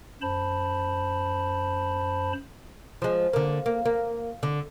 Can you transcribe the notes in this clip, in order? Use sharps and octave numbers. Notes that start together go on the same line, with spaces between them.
F#2 C5 A5 B5
F3 G#3
D3 A#3
A#3
A#3
D3